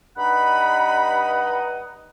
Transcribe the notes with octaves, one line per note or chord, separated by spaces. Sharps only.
G2 D#4 F#5 B5